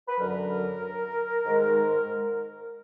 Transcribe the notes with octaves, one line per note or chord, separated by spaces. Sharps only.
B4
F#2 D3 F#3 A#4
G#2 D#3 G#3